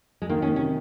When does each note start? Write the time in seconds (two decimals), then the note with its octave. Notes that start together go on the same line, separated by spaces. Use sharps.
0.22 G#3
0.29 D#3 A#3
0.42 C#4
0.49 C3
0.56 C#4